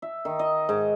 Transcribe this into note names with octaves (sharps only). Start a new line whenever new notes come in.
E5
D#3
D#5
G#2